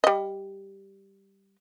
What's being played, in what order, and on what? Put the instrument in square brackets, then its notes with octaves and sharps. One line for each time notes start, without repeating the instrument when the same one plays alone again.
[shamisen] G3 D#5